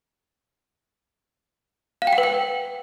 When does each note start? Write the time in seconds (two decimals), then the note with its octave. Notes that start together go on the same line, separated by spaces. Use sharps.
2.02 F5
2.07 G5
2.13 F#5
2.18 B4
2.23 G5